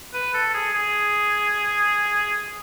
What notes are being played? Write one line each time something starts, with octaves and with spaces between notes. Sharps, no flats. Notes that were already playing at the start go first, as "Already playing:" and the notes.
B4
A4
G#4
G#4